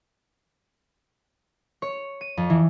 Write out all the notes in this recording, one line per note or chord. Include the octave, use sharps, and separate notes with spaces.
C#5
D#7
F2
E3